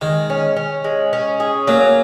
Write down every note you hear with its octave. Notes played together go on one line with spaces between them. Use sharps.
D#3 G#3
C#4
C#4
G#3
C#4
G#4
F#3 A#3